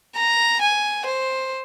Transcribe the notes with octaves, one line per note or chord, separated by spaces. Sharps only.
A#5
G#5
C5